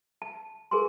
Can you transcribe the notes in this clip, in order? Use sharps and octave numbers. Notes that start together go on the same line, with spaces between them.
A5
G#4 A#4 B4 G#5 C6